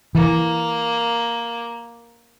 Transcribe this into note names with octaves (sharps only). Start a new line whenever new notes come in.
E3 A#3